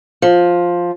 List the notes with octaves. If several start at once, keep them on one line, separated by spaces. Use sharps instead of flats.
F3